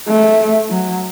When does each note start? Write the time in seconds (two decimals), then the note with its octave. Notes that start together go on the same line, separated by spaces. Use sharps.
0.08 A3
0.70 F#3